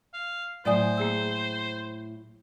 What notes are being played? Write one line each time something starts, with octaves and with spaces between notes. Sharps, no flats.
F5
A2 F#3 C5 D5 G#5 D#6
A#3 G#4 E6